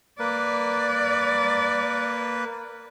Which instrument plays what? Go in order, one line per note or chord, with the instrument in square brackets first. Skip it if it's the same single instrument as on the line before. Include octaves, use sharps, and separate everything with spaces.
[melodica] A#3 B4 [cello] D5